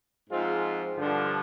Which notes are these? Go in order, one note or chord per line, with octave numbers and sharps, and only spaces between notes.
G#2 F3 G#3 C4 F4
G2 D3 F3